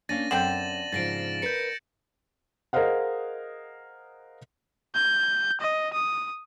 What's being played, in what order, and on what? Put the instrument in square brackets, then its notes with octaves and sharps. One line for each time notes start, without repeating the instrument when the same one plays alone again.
[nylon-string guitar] A#3 C#4 D4 [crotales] A6 A#6 D#7
[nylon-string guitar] F#2 [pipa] D3 C4 G5 [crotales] E7 F#7
[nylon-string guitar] G#2 C#3 F3 [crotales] A6 A#6 D7
[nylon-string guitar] A#4 B4 [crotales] G6 C#7
[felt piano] G#4 A#4 C5 D#5 F5 F#5
[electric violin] G6
D#5
D#6